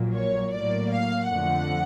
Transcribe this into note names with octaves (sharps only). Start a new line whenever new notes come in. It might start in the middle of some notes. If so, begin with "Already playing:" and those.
Already playing: A#1 A#2 F#3 A#3
C#5
A2 F#3 A#3 D5
F5
F2 D3 F3 A3 F#5